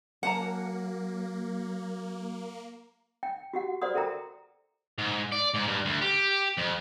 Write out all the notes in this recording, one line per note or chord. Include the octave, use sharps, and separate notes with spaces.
F#3 A#3 C#4 F#5 A5 A#5
G5
F#4 G4 F#5
B4 C5 D5 F#5 C6 D#6
A4 A#4 E5 G5 A#5
G#2
D5
G#2
G2
D2
G4
F2